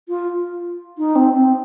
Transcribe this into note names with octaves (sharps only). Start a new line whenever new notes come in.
F4
D#4
C4
C4